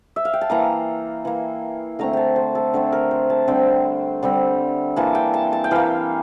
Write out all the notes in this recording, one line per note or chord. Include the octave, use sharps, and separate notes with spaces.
E5
F5
G5
A5
E3 A#3 A#5
E3 A#3
D3 A3 C4 A#5
G5 A5
C5
A4
D3 A3 C4
A#4
C5
A5
D3 G3 C4 G5
D3 G3 C4
E3 A#3 A5
G5
A5
A5
G5
E3 A#3 F5